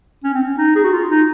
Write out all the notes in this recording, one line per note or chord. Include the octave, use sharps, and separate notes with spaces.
C#4
C4
C#4
D#4
G#4
F#4
F4
D#4